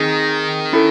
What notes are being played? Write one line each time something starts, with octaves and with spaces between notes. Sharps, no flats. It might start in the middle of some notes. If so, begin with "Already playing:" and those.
Already playing: D#3 C4 D#4 G#4
C#4 E4 A4